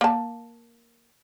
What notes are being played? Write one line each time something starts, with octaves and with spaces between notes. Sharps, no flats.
A#3 A5